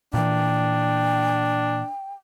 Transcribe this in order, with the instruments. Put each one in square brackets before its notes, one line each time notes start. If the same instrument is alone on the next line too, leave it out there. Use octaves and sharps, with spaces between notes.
[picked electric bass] A#2 E3 [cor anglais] D4 [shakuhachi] G5